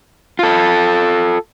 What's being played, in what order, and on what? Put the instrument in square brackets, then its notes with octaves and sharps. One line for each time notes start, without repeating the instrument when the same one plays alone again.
[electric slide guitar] F4 A4